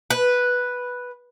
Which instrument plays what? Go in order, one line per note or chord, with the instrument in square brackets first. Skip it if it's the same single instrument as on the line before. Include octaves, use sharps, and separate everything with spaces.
[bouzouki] B4